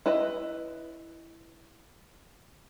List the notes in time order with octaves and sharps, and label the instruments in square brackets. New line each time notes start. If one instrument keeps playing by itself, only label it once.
[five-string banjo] E4 B4 D#5